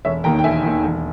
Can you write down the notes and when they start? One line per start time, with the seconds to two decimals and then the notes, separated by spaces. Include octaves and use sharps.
0.05 E1 C#5 E5
0.24 D#2 D#3 G5 A#5
0.39 G5
0.44 E1 E5 G#5
0.63 D#2 D#3
0.83 E1